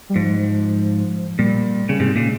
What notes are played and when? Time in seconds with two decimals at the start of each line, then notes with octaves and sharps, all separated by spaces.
0.10 G3
0.16 G#2 F3
1.38 A#2 G3
1.89 C#3 G3
2.00 G#2 C3 G#3
2.16 A#2 C#3